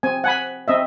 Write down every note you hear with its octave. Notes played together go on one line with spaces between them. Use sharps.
C4 G#5
F#5 G#5 B5
C4 D#5 E5